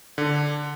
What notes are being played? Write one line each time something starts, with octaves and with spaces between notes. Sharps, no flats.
D3